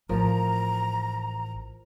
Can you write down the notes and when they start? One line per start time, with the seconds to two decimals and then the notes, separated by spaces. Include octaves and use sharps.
0.09 A1 F3 A#4 A#5